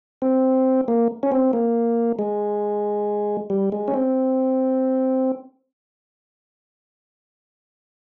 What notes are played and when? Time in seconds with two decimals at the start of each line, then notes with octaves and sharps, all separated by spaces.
0.22 C4
0.88 A#3
1.23 C#4
1.32 C4
1.53 A#3
2.19 G#3
3.50 G3
3.72 G#3
3.88 C#4
3.94 C4